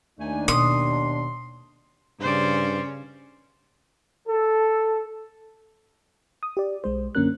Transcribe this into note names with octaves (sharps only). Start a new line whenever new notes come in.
D#2 A3 D4 D#4 G#5
B2 C6 D#6
G2 C#3 C#4 C5 D5
A4
D#6
G4 D5
B1 G#3 C5
F#2 D3 A#3 C#4 A#4 F#6